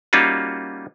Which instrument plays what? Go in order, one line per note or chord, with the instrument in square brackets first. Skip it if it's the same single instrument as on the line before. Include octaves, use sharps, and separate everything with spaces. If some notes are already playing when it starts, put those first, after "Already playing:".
[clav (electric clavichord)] G3 A#3 C#4 D#4 F4 F#4